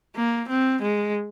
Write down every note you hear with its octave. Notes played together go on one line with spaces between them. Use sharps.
A#3
C4
G#3